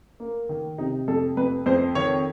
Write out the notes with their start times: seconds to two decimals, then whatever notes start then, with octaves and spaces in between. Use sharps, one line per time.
0.20 A#3
0.49 D#3
0.78 C3 D#4
1.08 F2 A4
1.37 F2 B4
1.66 F2 C5
1.95 D#3 C#5